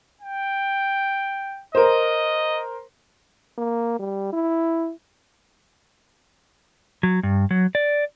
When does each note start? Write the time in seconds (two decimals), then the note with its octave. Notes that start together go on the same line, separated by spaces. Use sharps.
0.21 G5
1.75 A#4 C5 D#5
3.58 A#3
3.99 G3
4.33 E4
7.03 F#3
7.23 G2
7.51 F#3
7.75 D5